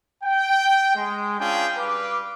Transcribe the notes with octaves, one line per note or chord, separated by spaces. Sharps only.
G5
G#3
C#4 D4 F4 G#4 F5 G5
G3 B4 F5 D6